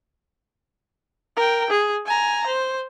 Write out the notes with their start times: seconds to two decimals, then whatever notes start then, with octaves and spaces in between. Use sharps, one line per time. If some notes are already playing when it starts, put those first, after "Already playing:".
1.36 A#4 G5
1.70 G#4
2.06 G#5 A#5
2.47 C5